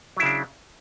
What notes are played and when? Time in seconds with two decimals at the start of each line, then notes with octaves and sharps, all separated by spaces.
0.17 F#3
0.20 E4
0.23 C#3
0.26 D4